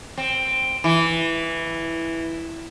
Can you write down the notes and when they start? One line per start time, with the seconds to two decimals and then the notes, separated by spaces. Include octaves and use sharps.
0.17 C4
0.84 E3